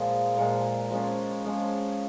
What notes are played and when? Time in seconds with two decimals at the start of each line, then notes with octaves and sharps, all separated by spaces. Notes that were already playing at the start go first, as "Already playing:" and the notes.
Already playing: A#2 F3 G#3
0.37 A#2 F3 G#3
0.91 F3 G#3 C#4
1.44 F3 G#3 C#4